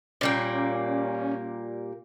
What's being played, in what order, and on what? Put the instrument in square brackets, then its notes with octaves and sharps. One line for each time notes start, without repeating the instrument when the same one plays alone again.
[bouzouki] A#2 G3 A#3 [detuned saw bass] C#4